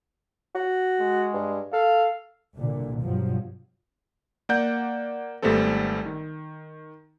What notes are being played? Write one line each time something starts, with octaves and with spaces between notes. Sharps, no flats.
F#4
G#3
G2
A4 F5
C2 A#2 D3
G2 B2 F3 F#3
A#3 D5 F#5 G6
G#1 G3 A3 B3 C4 A4
D#3